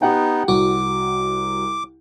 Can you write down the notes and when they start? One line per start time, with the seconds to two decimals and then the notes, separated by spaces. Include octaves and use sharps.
0.02 B3 D#4 G4 F#5 G5
0.48 C2 F#4 D6